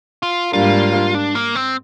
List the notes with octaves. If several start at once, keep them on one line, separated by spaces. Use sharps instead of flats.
F4
G#2 G3 A#3 D4 F4
D4
A#3
C4